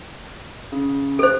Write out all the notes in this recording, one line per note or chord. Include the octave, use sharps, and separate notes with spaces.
C#3
A4 C5